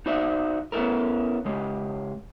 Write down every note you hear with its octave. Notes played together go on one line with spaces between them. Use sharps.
D#4 F#4 C5 D5 E5
B3 C#4 D#4 E4 A4 A#4
C#3 G#3 G4